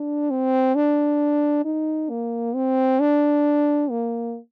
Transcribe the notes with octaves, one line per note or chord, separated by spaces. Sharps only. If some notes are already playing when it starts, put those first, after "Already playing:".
Already playing: D4
C4
D4
D#4
A#3
C4
D4
A#3